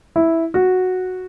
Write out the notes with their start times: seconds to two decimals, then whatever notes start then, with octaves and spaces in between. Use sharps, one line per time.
0.16 E4
0.54 F#4